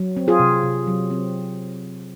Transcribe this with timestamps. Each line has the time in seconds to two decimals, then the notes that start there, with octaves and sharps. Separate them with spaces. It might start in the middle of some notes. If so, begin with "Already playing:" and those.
Already playing: F#3
0.17 C4
0.28 F4 G#4
0.39 C3
0.63 C3
0.87 F#3
1.11 C4